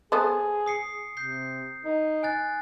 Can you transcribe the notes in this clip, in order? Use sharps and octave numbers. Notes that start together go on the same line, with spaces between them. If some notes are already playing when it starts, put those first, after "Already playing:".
B3 G#4 A4 C5
D#6 C7 C#7
C3 G6 C7
D#4
G#5 F#6 A6